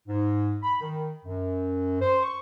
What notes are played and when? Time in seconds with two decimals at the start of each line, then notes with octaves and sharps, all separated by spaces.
0.08 G#2
0.62 B5
0.81 D#3
1.24 F#2
2.00 C5
2.23 C#6